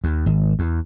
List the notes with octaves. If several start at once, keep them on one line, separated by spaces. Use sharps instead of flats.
D#2
G#1
E2